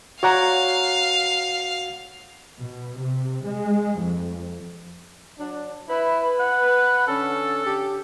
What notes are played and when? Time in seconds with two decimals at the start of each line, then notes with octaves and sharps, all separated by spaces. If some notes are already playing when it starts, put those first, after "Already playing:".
0.23 F#4 C#5 D5 F5 F#5 A#5
2.62 B2
3.00 C3
3.45 G#3
4.00 F2
5.39 F#3 D4
5.90 E4 B4
6.40 F#5
7.08 D3 C#4 A4
7.66 D3 G4